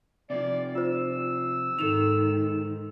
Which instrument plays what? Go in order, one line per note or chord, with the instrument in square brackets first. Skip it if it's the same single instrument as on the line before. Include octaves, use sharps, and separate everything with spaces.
[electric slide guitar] C3 E3 F3 [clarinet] D5
[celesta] F4 C5 [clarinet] E6
[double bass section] G#2 [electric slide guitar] D#3 [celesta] A4 E7 F7